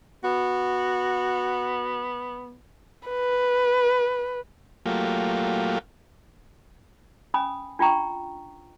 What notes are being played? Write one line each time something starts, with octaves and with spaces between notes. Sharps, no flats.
B3 F#4
B4
F#3 A3 A#3 F4 G4
C#4 G#5 B5 D#6
D4 F4 G5 A#5 C#6